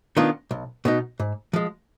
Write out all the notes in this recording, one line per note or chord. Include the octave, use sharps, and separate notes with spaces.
D#3 B3 D4 F4
B1
B2 B3 D#4
G#2
F3 G#3